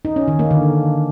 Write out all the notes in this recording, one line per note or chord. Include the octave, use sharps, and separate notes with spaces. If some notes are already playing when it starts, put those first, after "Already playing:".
D#4
C#4
D#3
A#3
D3